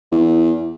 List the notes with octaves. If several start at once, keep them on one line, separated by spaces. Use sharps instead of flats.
E2